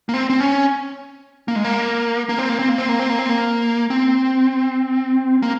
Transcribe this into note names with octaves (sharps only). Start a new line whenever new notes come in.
A#3
C4
C4
C#4
A#3
G#3
A#3
A#3
C4
A#3
C4
A#3
C4
A#3
C4
A#3
C4
A#3
C4
A#3